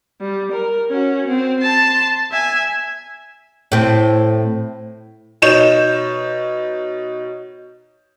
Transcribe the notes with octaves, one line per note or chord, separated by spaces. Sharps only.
G3
A#4
C#4 F#4
C4
A5 C6
E5 G#5
A2 C4
B2 D#4 C#5 G6 E7